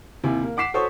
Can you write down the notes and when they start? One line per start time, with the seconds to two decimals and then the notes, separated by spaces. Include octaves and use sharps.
0.24 D#2 C3 E4 G#5
0.43 A#3
0.57 F#5 D6 B6 C7 E7
0.74 F#4 A4 C5 C#5 C#6 D#6